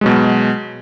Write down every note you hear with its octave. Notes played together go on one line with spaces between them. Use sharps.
B2 F#3 G#3